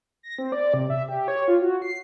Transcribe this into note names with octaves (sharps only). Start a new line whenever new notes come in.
A#6
C4
D5
C3
E5
G4
C#5
F4
F#4
C7